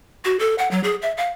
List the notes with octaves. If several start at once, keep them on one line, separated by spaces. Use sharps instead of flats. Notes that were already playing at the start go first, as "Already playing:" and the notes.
F#4
A4
F#5
F#3
G#4
E5
F5